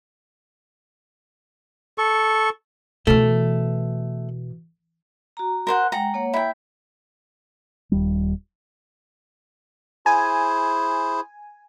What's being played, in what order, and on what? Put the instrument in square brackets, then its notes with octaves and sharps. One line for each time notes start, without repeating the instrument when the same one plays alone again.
[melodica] A4 C#6
[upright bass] B2 E3 [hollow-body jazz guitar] A3
[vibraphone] F#4 A#5
[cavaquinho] A#4 C5 F#5
[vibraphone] G#3 F#5 G5 [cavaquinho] A#5
[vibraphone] A#3 C#5 F#5
[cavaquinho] E4 G5
[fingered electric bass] D#1 D#2 G3
[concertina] E4 G#4 C5 [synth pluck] G#5